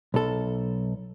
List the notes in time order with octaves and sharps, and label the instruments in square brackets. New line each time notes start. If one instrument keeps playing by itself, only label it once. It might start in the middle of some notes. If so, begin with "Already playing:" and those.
[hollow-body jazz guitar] B1 A4